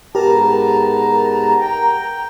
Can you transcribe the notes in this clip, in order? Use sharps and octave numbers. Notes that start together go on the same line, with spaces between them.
G#2 B3 G4 A#4 A5 A#5
G5